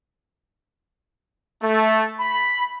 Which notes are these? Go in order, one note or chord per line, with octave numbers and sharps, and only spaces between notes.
A3
B5